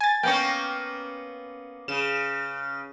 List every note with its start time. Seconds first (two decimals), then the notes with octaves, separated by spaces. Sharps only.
0.01 G#5 A6
0.23 A#3 B3 C#4 G5 C#6
1.88 C#3 E7